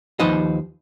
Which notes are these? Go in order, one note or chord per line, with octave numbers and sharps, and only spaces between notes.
D#2 F3 D#4 B4 C5 D#5